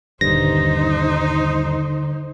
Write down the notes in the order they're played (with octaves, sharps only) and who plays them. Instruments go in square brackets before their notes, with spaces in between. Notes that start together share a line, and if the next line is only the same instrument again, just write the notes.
[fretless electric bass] D#1 G2 [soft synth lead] D3 [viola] D#4 C5 [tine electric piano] A#6